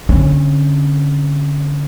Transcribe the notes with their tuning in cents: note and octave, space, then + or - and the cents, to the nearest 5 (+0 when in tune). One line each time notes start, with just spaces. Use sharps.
D3 -25 C#4 -30